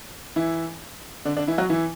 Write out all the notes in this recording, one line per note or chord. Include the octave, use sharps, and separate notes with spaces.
E3 E4
D3 D4
D3 D4
E3 E4
F#3 F#4
E3 E4